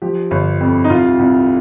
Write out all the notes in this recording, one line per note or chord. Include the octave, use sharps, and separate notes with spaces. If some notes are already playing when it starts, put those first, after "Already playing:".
F3 G4
G1
F2
D#4
C2 F4
C2